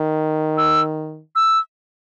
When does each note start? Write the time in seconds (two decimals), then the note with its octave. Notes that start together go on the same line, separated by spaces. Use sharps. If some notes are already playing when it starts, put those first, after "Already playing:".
Already playing: D#3
0.58 E6
1.36 E6